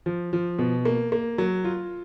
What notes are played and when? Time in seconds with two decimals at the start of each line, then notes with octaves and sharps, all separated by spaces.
0.06 F3
0.33 F3
0.59 B2
0.85 A#3
1.12 A#3
1.38 F#3
1.64 F4